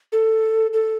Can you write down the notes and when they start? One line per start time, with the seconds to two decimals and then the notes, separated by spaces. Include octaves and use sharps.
0.12 A4
0.73 A4